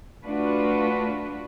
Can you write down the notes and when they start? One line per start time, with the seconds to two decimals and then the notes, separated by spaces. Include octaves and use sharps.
0.25 A3 D4 F4 F#4 B4